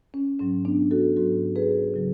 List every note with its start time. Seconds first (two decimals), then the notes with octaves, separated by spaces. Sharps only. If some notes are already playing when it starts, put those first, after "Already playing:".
0.14 C#4
0.39 G#2 F#3 C#4
0.65 B3 D4
0.91 F#4 A4
1.16 G#2 F#3 F#4 A4
1.56 G#4 B4
1.94 C#3 F#3